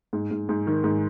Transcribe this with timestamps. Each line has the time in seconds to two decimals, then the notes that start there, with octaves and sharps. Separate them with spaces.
0.13 G#2
0.31 G#2
0.49 G#2
0.67 D#3
0.84 G#2